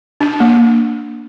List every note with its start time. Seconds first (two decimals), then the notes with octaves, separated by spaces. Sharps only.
0.21 D4
0.40 A#3